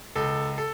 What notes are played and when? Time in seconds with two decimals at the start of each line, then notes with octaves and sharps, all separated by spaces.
0.15 C#2 A4
0.58 A4